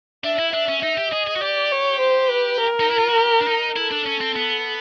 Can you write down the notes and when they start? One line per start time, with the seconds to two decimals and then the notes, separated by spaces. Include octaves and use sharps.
0.24 D4 E5
0.39 E4
0.53 D4 E5
0.68 C#4
0.82 D#4 E5
0.98 G4
1.12 G#4 D#5
1.27 G#4
1.36 F#4
1.41 G4 D5
1.72 C#5
2.00 C5
2.30 B4
2.60 A#4
2.80 D#4
2.89 E4
2.99 F4
3.09 F#4
3.18 G4
3.41 D4
3.47 D#4
3.77 E4 A4
3.91 D4
4.06 C#4
4.21 C4
4.36 B3